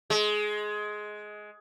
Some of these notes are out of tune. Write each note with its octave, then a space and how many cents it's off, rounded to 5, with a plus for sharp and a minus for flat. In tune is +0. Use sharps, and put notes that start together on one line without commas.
G#3 +15